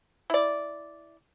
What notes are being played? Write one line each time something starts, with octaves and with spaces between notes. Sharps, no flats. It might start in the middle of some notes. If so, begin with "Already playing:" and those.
E4 D5